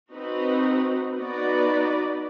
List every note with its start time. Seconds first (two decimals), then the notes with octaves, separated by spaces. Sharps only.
0.13 C4 D#4 F#4 B4
1.18 B3 D#4 F#4 B4 D5